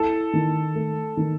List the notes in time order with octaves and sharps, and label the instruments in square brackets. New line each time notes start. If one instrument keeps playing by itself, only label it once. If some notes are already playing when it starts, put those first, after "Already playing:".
Already playing: [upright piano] E4 [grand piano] A4
[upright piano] D#3
A3
D#3